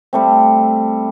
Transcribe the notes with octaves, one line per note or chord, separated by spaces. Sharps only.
G3 A3 C4